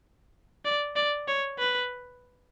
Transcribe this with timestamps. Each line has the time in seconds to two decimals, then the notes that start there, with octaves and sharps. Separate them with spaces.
0.65 D5
0.96 D5
1.28 C#5
1.59 B4